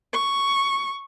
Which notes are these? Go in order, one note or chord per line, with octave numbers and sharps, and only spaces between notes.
C#6